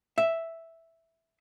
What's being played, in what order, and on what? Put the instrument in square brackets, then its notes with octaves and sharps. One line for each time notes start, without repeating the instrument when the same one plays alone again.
[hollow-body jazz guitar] E5